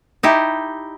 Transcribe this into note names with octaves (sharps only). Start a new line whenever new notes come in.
D#4 E4 G4